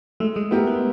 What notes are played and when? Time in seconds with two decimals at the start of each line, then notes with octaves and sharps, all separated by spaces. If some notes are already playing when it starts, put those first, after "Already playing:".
0.20 G#3 A3
0.36 G#3
0.51 A3 B3 E4 G4 A#4
0.67 B3